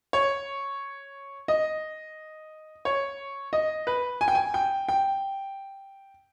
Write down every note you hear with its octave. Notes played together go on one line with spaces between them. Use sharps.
C#5
D#5
C#5
D#5
B4
G#5
G5
G#5
G5
G5